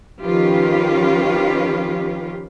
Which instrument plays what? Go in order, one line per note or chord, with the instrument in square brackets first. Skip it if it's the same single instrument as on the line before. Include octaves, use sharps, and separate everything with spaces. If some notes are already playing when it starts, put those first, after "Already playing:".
[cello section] D#3 F3 C#4 F4 G4 B4